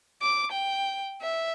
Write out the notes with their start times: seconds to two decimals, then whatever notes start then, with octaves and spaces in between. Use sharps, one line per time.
0.22 D6
0.52 G5
1.21 E5